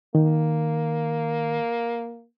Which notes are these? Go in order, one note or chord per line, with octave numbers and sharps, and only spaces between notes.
D#3 A#3